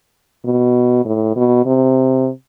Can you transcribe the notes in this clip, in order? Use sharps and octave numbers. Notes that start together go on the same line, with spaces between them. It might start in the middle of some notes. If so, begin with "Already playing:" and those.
B2
A2
B2
C3